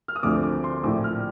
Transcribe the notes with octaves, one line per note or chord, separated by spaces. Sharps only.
F6
D#6
D2 D3 F3 A3 C4 D6
D6
C6
A#1 A2 F3 A3 D6
F6